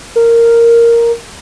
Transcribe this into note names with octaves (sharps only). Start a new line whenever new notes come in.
A#4